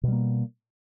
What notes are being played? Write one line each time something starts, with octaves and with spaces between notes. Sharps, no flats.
B2 G3 A#3